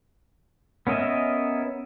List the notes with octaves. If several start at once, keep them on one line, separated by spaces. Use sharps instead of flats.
B3 C#4 A#4 D#5 E5